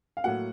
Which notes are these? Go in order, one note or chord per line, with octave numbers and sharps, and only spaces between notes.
F5
A2 F#3 A#3 F#5